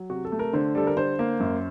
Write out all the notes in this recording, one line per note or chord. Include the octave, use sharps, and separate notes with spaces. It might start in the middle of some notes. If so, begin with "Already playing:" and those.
Already playing: F#3
C3 F#4
A4
A3
A#4
D3 C5
G3 A4
A#4
D3 C5
A#3
F#2